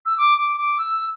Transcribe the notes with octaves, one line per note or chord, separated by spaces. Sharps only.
E6
D6
D6
D6
E6